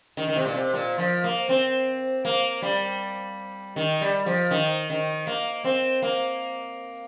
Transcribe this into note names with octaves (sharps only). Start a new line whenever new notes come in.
D#3
D#3
C3
A#2
C3
A#2
F3
A#3
C4
A#3
G3
D#3
G3
F3
D#3
D#3
A#3
C4
A#3